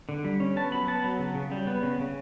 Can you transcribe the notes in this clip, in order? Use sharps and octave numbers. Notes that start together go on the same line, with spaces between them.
D3
G3
C#4
B3 A5
F#3 B5
B3 A5
F#3
C#3
C#3
G3
B3
C#3
C#3